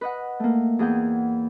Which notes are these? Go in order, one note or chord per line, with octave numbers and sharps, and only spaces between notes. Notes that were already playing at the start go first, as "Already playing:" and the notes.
B4 D#5 F#5
A3 A#3
E2 G#4 F#5 G5